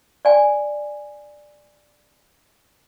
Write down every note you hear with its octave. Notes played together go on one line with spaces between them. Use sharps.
D5 G#5